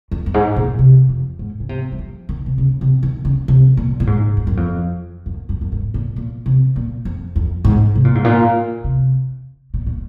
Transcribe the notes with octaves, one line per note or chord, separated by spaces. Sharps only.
F2
F#2
G#2
A#2
C3
F2
G#2
C#3
C3
F#3
F3
D#3
C3
C#3
C3
D#3
C#3
C3
A#2
A#2
G#2
F2
F#2
F2
F#2
F#2
F#2
G#2
A#2
A#2
C3
A#2
F2
F2
G#2
C3
A#2
G#2
A#2
C3
A#2
A#2